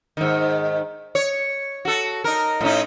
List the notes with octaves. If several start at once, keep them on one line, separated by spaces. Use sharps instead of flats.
G#2 D#3
C#5
F#4 A4
D#4 A#4
A2 C#4 D#4